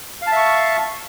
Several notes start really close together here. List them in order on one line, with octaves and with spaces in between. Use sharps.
F5 A5 E5 C#6